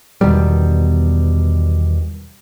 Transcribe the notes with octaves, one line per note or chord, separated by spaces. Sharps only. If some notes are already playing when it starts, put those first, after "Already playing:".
E2 B2 D#3 G3